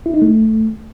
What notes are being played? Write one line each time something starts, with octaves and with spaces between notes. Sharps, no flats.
E4
D#4
A3